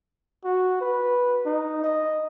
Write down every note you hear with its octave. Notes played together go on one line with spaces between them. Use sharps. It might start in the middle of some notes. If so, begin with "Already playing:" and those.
F#4
B4
D#4
D#5